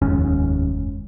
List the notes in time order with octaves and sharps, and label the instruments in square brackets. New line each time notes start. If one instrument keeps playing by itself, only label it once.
[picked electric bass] F1 D#2 G#2 C#4